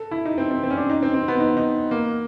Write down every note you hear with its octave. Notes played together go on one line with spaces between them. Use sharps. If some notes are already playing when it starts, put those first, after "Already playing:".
Already playing: A4
E4
D#4
C4
C4
C4
C#4
D4
D#4
C4
C4
B3
D#4
D#4
A#3